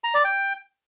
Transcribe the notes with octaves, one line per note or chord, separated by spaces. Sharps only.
A#5
D5
G5